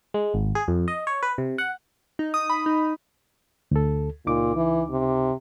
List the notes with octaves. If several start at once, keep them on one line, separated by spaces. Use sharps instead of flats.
G#3
G#1
G#4
F2
D#5
C#5
B4
C3
F#5
D#4
D#6
B5
D#4
D2 A4
C#2 A#2 D#4 D6
E3
C3